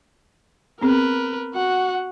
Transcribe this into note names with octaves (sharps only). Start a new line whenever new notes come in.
B3 C4 G#4 A#4 B4
F#4 F#5